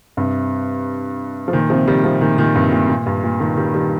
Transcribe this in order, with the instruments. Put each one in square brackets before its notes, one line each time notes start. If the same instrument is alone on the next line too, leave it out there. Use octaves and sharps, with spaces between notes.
[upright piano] G2 C3
F3
A#2 D#3
C3 F3
D#3 G3
C3 F3
A#2 D#3
A#2 D#3
G2 C3
A#2
A#2
G2
A#2
A#2 D#3
D#3 G3
D#3 G3